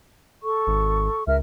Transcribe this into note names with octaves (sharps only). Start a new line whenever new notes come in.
A4 C#6
G#1
C#2 A#4 E5 F6